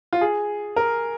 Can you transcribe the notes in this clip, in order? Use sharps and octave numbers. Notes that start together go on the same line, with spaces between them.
F4
G#4
A#4